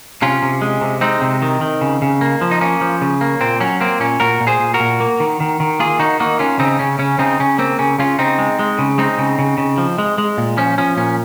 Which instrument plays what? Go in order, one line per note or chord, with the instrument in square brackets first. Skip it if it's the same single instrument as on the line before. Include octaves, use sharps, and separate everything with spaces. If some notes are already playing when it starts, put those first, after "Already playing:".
[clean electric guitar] C3 C#4 F4
C3
G#3
C3
G#3 C4 D#4
C3
D#3
D#3
C#3
C#3
A#3
F3
D#4
A#3 C#4
F3
C#3
A#3
A#2 C4
F#3 C#4
A#3 C4
A#2 C#4
A#2 F#4 A#4
A#2
G#4 C5
A#2
F#4 A#4
A#2
A#3
D#3
D#3
D#3
A#3 F4 G#4
D#3 D#4 F#4
A#3 D#4 F#4
D#3 C#4 F4
C#3 C4 D#4
C#3 C#4
C#3 C#4
C#3 C4 D#4
C#3 C#4
A#3 C4
C#3 C#4
C#3 C#4 F4
C#3 C4 D#4
G#3
G#3
C#3
G#3 C4 D#4
C#3
C#3
C#3
F3
G#3
G#3
A#2
F3 C#4
F3 C#4
A#2 C#4